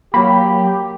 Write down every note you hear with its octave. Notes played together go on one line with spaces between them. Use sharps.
F#3 A#3 G4 B5